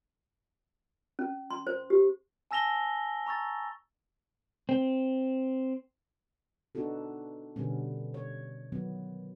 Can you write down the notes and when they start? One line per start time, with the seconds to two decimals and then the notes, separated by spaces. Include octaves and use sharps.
1.19 C#4
1.51 C6
1.67 C5
1.90 G4
2.51 G#5 A5 E6 A#6 F7 G7
3.26 A#5 C#6 E6 A6
4.69 C4
6.75 B3 D4 D#4 F#4 A4
7.56 B2 D3 G3 B3 C#4
8.14 C#5
8.72 D#3 F#3 B3